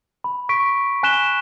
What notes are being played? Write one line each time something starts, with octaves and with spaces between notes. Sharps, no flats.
B5
C#6 B6 D7
G#5 F#6 B6 E7 G7